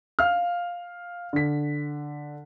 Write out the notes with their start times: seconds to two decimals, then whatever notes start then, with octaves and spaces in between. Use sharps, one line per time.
0.19 F5 F6
1.33 D3 B6